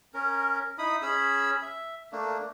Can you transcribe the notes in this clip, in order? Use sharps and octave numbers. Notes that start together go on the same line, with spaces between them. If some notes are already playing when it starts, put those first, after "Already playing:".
C#4 A#4
D#4 E4 B5 D#6
C#4 G#4 B5 E6
E5
A3 A#3 D4